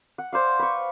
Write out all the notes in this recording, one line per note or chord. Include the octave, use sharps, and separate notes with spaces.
F#5
C5 D5 F5
B4 C#6